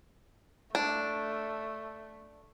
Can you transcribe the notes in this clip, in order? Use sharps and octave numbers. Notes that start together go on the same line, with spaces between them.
A3 D4